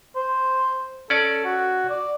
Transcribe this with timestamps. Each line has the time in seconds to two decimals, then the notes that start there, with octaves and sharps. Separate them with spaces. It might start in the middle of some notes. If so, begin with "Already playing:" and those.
0.16 C5
1.10 C#4 A4 D5
1.45 F#4
1.90 D5